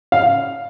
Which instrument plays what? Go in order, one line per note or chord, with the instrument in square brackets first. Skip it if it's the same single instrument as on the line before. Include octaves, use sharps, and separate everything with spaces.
[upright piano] F5